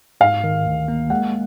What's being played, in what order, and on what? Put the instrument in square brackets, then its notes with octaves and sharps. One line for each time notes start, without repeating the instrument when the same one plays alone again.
[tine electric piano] G#2 [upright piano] F5
[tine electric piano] D#3
D2
A#3
[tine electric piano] G#3 [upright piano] F#5